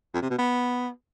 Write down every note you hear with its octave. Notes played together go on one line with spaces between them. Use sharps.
F2
C3
B2
B3